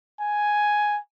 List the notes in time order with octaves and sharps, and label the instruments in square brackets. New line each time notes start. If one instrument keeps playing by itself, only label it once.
[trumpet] G#5